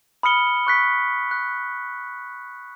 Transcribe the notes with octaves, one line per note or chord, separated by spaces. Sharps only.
B5 D#6 F6 C#7 G7
C#6 F#6 B6
F#6